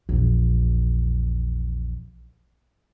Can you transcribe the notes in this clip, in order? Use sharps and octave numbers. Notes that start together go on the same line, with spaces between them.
A#1 E2